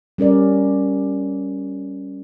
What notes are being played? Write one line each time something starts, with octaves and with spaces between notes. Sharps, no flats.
G3 C#4 A#4 D5